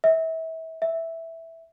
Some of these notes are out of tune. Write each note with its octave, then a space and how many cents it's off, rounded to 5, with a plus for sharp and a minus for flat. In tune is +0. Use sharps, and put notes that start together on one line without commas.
E5 -30
E5 -5